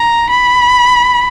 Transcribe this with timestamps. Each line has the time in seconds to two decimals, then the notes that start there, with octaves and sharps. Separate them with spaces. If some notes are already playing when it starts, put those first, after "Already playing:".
Already playing: A#5
0.30 B5